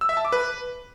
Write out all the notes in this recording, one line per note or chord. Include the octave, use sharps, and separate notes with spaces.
E6
E5
A5
D6
B4